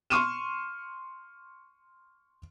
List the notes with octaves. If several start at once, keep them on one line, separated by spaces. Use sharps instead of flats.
C6 C#6 F6 D#7 E7